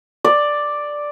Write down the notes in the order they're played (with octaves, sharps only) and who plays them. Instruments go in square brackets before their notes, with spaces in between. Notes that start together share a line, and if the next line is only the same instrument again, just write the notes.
[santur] D5